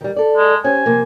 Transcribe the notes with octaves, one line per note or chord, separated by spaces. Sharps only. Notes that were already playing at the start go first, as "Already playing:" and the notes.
D#3 G3
A4 D5
G#3
C#4 G4 C5 G#5
C3 F3 A#3